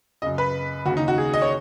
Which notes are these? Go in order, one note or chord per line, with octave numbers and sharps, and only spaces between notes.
F#2 C#3 D#5
B4
D#2 C#3 F#4
D#4
F#4
G#4
D#5
C#5